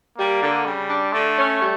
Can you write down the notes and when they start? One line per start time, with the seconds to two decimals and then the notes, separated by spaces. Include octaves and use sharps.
0.18 G3 A#3
0.42 D3
0.65 C#3 G3
0.89 D4
1.13 D3 A3
1.37 C#4
1.60 G3